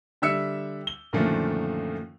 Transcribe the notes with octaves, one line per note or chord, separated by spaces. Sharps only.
D3 G3 E5 E6 C#7
G7
F#2 A#2 D3 D#3 F3 A3